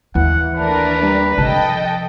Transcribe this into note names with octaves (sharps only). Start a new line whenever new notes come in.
D#2 E3 F#5
A3 D4 A#4 B4
G3
C3 F3 A4 D#5 G5 A5